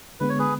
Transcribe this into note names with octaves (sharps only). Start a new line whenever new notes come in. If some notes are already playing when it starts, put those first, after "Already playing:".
D3 G#3 B3 B4
C#5
G#4 B4